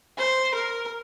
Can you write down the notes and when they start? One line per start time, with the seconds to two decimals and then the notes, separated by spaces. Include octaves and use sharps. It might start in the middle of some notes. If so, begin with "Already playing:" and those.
0.18 C5
0.55 A#4